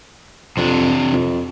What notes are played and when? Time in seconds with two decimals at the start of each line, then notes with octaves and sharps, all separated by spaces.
0.57 F2 C3 D4
1.13 F2